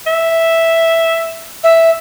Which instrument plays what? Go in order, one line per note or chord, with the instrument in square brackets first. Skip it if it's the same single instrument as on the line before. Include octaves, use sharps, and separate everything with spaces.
[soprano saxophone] E5
[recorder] E5